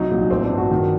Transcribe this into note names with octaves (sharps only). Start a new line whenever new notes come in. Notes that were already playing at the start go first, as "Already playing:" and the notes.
Already playing: C2 F#3 D#4
A#1
A1 C4
D4
G2
F#4
D#3